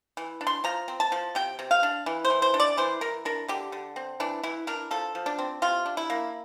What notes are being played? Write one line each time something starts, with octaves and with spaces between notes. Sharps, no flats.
E3
D4
C6
F3 A#5
C4
A5
F3
C3 G5
C3
F5
D4
E3
C5
E3
C5
D4
D5
E3 C5
E3 A#4
D4 A#4
D3 G4
D3
C4
E3 D4
E3 E4
D4 A#4
F3 A4
F3
D4
C4
C3 F4
D4
E4
A#3